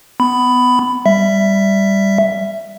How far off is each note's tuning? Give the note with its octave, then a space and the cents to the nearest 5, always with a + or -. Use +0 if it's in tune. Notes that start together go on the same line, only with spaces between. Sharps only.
B3 +15 B5 +10
G3 +0 E5 +5